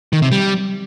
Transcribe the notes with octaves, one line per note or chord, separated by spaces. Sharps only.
D#3
C3
G3